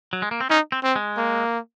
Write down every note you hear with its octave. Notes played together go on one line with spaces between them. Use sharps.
F#3
G#3
A#3
C4
C#4 D#4
C4
C4
G#3
A#3